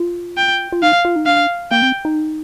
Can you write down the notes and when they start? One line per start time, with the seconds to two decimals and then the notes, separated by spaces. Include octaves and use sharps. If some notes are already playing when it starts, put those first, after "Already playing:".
Already playing: F4
0.37 G5
0.72 F4
0.82 D#4 F5
1.05 F4
1.16 D#4
1.26 D4 F5
1.71 A#3 G5
1.82 C4
2.05 D#4